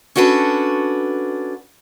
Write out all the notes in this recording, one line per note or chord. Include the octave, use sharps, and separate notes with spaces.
C#4 D4 F#4 A4 B4